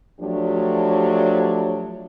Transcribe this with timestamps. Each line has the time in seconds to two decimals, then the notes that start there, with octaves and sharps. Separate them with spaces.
0.20 F3 F#3 A3 D4 G4 C#5